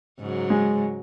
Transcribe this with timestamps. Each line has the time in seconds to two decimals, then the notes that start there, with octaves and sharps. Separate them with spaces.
0.19 G#2 C#3 F#3
0.50 G#3